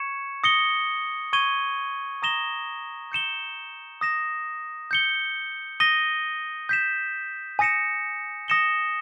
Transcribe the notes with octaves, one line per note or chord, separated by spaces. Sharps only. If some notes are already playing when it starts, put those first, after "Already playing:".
Already playing: C#6 G#6 C#7 E7
D#6 A#6 C#7 G7
C#6 G#6 D#7 G7
A#5 D#6 A#6 E7 G7
G6 C#7 E7 G7
D#6 A#6 E7
G6 C#7 G7
D#6 A#6 D#7 G7
G6 B6 E7
G#5 D#6 A#6 C#7 E7
D#6 A#6 C#7 E7 G7